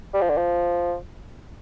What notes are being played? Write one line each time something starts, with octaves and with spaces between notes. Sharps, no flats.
G3
F3
D3
F3